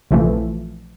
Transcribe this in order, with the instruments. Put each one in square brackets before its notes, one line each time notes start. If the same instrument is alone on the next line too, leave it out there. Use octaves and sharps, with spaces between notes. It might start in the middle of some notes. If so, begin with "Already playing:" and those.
[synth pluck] A#1 C3 E3 F3 A3